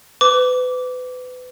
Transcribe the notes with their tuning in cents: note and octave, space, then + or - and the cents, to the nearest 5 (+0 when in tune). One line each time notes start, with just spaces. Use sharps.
B4 +30 D6 -15